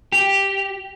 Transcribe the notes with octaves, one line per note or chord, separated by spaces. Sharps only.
G4